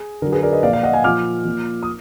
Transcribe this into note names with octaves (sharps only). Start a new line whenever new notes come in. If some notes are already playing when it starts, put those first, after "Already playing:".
Already playing: G#4
D3 F#3 A#4
G#4 B4
A#4 D5
B4 D#5
A#2 F3 D5 F5
D5 F5
D#5 F#5
F5 G#5
A#2 F3 D6 F6
A#2 F3
D#6